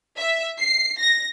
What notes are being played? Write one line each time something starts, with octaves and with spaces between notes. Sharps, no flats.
E5
C7
A#6